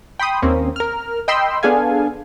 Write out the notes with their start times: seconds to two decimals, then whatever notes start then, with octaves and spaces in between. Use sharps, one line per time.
0.19 G5 B5 C6 D#6
0.42 D#2 A#3 C4 C#4
0.76 A#4 F6
1.28 D#5 G5 B5 C6 E6
1.63 B3 D4 G#4 A4 F5 G#5